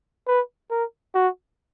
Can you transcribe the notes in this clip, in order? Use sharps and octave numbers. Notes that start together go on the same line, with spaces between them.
B4
A#4
F#4